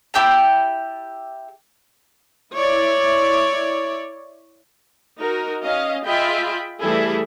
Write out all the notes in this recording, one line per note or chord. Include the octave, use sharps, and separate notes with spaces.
E4 G4 G5 A5
E4 C#5 D5
D#4 F#4 A#4
C#4 D#5 F5
F4 G#4 D#5 E5 G5 B5
E3 G3 A3 E4 G#4 A4